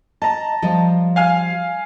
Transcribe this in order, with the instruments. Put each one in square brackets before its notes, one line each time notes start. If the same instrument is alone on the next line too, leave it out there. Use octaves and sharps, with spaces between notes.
[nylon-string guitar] D#5 [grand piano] A5 A#5
[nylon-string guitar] F3 G3 D#5
[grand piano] F5 G#5 F6